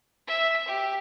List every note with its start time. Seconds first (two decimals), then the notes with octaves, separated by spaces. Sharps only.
0.28 E5
0.68 G4